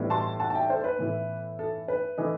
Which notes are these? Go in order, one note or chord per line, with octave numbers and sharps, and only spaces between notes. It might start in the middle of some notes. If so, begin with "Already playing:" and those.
Already playing: A2 E3 G3 B3 D#4
A5 C6
F#5 A5
A5
E5 G5
A4 C5
B4
A2 E3 B3 E4
A4
B4
E3 A3 D#4